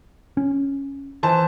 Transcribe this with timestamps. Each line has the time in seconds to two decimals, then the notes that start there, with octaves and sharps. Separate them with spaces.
0.37 C#4
1.23 E3 C5 A5